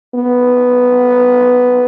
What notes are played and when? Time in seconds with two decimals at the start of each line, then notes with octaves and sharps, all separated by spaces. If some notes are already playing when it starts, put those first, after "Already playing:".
0.14 B3